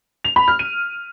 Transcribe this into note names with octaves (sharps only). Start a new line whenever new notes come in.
F7
B5
F6
D#7